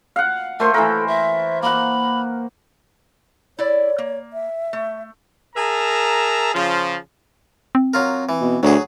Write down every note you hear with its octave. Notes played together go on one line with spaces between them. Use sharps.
F5 F#5
A3 A#4 C5
E3 A4 A#4
E5
A#3 F#5 B5
E4 C#5 D5
A#3
E5
A3
G#4 A#4 E5 A5 A#5
C#3 F3
C4
F#3 F4 A#4
E3
B2
D2 F#3 G#4